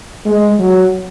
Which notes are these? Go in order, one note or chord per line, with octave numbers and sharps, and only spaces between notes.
G#3
F#3